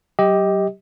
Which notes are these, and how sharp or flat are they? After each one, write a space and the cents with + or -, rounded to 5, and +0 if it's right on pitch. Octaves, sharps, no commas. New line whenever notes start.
F#3 +35 G4 +5 D#5 +20